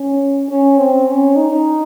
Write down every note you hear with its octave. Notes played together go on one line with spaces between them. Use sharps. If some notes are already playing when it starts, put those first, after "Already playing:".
Already playing: C#4
C#4
C4
C#4
D#4